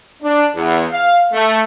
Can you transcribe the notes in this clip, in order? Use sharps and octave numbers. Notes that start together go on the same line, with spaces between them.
D4
E2
F5
A3